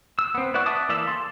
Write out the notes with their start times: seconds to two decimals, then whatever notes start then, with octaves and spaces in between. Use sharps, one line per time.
0.19 E6
0.35 B3 C4
0.54 E4 B4 D5 F#5 C#6
0.66 E5 A5 D6 D#6
0.89 E3 A#3 D5 E5 E6
1.08 A4 A5 C6